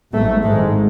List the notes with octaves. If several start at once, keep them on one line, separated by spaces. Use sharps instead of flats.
A1 G#2 A3
G#1 G#2 G#3